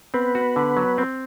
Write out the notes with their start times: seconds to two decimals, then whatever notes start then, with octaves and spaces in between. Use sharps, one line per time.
0.14 B3 C4 B4
0.35 F#4
0.56 D3
0.77 F#3
0.98 C4